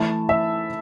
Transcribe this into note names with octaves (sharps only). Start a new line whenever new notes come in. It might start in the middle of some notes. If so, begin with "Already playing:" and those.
Already playing: E3 A3 E4 A5
E5